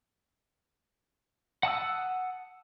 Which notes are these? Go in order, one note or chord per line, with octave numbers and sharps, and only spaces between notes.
F#5 A5 D#6 E6